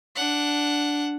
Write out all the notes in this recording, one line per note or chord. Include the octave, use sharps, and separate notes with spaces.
D4 F#5